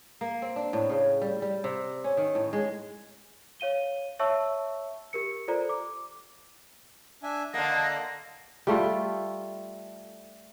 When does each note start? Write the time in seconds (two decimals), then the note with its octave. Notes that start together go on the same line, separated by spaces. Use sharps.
0.21 A#3
0.42 C4
0.56 D4
0.73 A2
0.90 C#3
1.22 G3
1.42 G3
1.64 C3
2.04 C#4
2.17 D#3
2.35 A2
2.53 G#3
3.60 C#5 F5 D#7 G7
4.19 C#5 E5 A5 C#6 E6
5.13 G4 A#4 C#7
5.48 F4 A4 C5 D5 A#5
5.69 D6
7.23 D4 E5 G#5
7.54 D3 A#3 D#5 F#5 A5 A#6
8.67 G3 A3 F4 A4